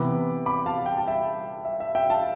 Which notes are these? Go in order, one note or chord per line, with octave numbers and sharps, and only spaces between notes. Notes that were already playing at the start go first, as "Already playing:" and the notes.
Already playing: C3 E3 B3 B5 D6
B5 D6
F5 A5
G5
A5
E5 G5
E5
E5
E5 G5
F5 A5